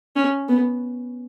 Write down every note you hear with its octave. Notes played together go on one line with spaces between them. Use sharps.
C#4
B3